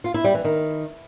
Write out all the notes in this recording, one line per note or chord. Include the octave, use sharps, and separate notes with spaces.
F4
E4
G3
E3
D#3